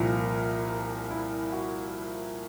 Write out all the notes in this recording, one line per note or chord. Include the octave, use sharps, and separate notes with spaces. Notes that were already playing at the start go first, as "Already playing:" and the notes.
Already playing: C2 A#2 F3 A#4
E4
F#4